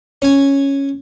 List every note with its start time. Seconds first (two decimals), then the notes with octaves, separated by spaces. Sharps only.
0.22 C#4 G#5